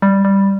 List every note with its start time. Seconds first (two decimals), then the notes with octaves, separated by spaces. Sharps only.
0.02 G3
0.25 G3